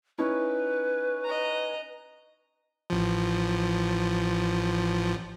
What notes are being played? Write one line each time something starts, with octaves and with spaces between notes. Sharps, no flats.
C#4 D#4 E4 B4
D#5 A#5
A1 F3